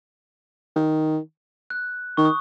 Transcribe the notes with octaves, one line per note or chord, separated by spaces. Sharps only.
D#3
F#6
D#3 C#6
D#6